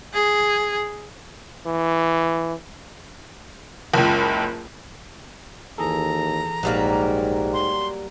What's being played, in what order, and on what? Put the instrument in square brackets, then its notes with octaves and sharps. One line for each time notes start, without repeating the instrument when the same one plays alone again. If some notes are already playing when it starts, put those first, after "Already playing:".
[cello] G#4
[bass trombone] E3
[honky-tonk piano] F#1 C#2
[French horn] D#2 [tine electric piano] E3 G#4 A4 [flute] A#5
[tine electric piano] A#1 [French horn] G#2 [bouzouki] F#3 G3 A#3
[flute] C6